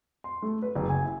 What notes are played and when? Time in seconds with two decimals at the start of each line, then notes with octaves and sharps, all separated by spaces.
0.24 C6
0.42 A3
0.62 B4
0.75 F#1
0.89 G#5
1.04 E4